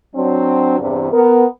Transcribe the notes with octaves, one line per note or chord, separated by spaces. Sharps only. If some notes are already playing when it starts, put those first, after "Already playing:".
F#3 C4 D4
E2 G2 C3
B3 A#4